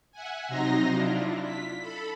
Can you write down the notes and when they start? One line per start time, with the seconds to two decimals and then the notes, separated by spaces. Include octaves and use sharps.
0.12 E5 F#5 G#5
0.48 C3 F#3 D#4 A#5 C6 A#6
0.88 D4 E4 F4
1.43 B6
1.81 A4 B5